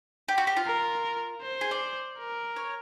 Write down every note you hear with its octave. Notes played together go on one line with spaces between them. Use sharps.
G4
F#4
G4
F4
A#4
C5
G#4
D5
A#4
C#5